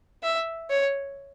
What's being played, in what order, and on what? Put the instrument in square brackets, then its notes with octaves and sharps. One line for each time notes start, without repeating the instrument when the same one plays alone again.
[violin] E5
C#5